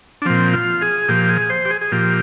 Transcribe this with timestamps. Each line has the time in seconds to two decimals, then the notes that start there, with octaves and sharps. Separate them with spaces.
0.22 D4
0.25 A#2 F3 C4
0.54 F4
0.82 G#4
1.09 A#2 F3 G4
1.29 G#4
1.50 C5
1.65 G4
1.70 G#4
1.81 G#4
1.92 A#2 F3 G4